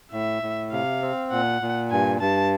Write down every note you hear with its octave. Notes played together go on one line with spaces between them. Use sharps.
A2 E5
A2
C3 F5
C4
A#2 F#5
A#2
G2 G#5
G2 A5